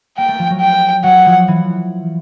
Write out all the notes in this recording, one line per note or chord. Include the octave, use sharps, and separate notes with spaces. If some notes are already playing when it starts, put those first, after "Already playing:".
A#3 G5
A3
F3
F#3
G5
F#3 F#5
F3
E3